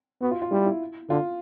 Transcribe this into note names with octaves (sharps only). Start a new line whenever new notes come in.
B3 F#4
F4
F4
G3 E4
E4
D3 F4